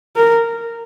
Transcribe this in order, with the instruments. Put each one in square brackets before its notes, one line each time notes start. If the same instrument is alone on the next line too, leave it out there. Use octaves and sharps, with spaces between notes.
[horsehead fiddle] A#4